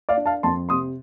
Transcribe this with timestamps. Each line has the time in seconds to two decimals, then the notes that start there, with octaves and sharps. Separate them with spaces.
0.09 D5 F5
0.17 D4
0.26 F5 A5
0.43 F2 A5 C6
0.69 C3 C6 D#6